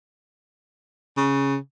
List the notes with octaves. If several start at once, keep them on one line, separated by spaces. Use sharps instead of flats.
C#3